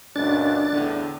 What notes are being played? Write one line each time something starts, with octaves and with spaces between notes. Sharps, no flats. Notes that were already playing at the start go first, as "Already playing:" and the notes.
C#2 F#2 A#2 D4 A6
E2 A2 D3